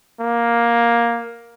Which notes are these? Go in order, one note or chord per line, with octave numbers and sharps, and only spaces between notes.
A#3